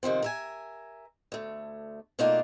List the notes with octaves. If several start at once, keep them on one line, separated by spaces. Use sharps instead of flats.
C3 D#3 F3 C4
A#4 E5 G#5
D2 A3
B2 A3 A#3 D4 D#4 F4